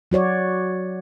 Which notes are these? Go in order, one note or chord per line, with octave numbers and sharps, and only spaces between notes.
F#3 F#4 C#5 D5